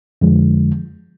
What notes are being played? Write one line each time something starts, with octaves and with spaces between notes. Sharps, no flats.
F2 D3 F3 G#3